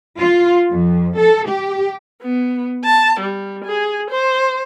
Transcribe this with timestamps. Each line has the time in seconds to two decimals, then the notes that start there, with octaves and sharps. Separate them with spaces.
0.20 F4
0.70 F2
1.18 A4
1.48 G4
2.22 B3
2.85 A5
3.20 G3
3.65 G#4
4.10 C5